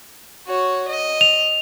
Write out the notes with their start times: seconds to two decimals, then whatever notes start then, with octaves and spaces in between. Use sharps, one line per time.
0.47 F#4 C#5
0.88 D#5
1.21 F7